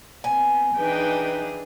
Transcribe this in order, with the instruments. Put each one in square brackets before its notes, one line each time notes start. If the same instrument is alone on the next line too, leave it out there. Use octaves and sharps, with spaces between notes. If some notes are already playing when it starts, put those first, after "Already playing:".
[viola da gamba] B3 C4 [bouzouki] G#5
[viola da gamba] E3 D4 G#4 [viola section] D#4 B4 G5